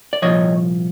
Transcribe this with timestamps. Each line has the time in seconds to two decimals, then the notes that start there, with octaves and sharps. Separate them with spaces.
0.13 D5
0.22 C2 A#2 F3 C#5 D#5